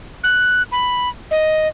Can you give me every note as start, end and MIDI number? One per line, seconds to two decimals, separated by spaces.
0.24 0.63 90
0.72 1.09 83
1.31 1.68 75